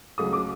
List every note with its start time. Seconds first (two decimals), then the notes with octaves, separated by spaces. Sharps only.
0.18 C#2 C#3 F#3 A3 D#6
0.33 D6